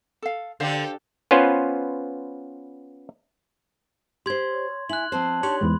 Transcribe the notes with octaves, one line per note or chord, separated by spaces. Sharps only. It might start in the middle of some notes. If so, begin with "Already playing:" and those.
A4 F5
D3 G4 A4 C5 F5
B3 C#4 F4 B4 C5
G4 C5 C6 G#6
C#5
E4 G#5 F#6 F#7
F3 C4 C5 A5
D4 D#4 G4 C#5 C6
E2 G#2 B5